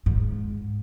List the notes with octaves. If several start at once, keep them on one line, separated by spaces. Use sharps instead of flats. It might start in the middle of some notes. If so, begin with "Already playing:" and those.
G#2